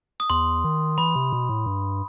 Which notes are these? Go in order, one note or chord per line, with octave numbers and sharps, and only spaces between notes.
D#6
E2 C6
D#3
E3 B5
C3
B2
A2
G2